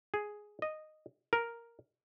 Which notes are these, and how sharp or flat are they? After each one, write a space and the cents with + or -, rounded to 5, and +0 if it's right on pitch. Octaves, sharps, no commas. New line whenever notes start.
G#4 +5
D#5 -10
A#4 +0